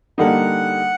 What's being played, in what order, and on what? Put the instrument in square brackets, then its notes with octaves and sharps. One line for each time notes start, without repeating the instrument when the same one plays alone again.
[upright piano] D3 G3 A#3 D#4 [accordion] F#5